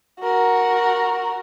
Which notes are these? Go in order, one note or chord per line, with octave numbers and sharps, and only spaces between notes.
F#4 A#4